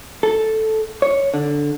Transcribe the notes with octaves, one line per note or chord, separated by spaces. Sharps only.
A4
C#5
D3